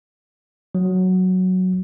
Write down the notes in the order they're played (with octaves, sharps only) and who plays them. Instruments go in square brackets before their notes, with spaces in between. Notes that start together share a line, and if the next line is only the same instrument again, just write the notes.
[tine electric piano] F#3